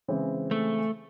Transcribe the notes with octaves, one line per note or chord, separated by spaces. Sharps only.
C#3 E3 G#3 C4
A3